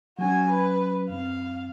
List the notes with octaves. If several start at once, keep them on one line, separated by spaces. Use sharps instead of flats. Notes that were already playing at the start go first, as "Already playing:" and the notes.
F#3 C#4 F#4 G#5
B4
F#2 C4 F5